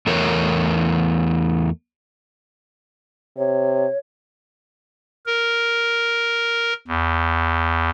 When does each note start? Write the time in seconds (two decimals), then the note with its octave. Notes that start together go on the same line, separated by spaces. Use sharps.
0.07 E2 A3 A#4 C#5
3.37 C3 C#5
5.26 A#4
6.88 E2